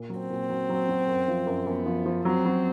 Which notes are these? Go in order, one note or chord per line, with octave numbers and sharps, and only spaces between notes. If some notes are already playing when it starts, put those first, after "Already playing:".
Already playing: A#2
F#3
C4
A#2
F#3
F#3
F#3
F#2
F3
F#2
F#2 B3
F3
F3
F#3 C4
F#3